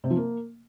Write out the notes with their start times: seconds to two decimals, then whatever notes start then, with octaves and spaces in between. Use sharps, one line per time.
0.04 C3
0.10 F3
0.17 A#3